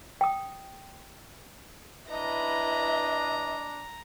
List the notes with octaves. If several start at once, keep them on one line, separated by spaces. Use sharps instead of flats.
G5 D#6
D4 E4 B4 D#5 A#5